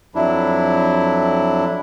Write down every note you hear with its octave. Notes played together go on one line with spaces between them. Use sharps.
F2 F#3 D4 E4